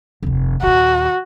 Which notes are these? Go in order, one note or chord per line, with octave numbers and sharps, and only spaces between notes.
F1 D#2
D#2 A#2 F#4